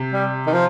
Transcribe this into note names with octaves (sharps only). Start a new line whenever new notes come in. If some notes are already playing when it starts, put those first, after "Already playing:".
Already playing: C3
G3
D#3
F3